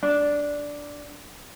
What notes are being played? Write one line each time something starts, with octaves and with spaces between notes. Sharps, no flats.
D4